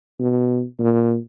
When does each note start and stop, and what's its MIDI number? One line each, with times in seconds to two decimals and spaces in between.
0.20 0.63 47
0.79 1.17 46